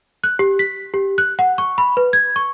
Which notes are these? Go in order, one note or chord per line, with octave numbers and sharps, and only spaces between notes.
F#6
G4
B6
G4
F#6
F#5
C#6
B5
B4
G#6
C#6